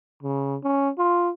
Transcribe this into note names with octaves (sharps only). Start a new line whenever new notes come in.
C#3
C#4
F4